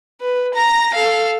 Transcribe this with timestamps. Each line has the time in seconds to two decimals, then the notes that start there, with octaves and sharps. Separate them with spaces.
0.21 B4
0.54 A#5 A#6
0.95 A4 F5